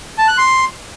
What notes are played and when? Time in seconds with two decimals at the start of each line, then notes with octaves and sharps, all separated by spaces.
0.18 A5
0.28 F#6
0.38 C6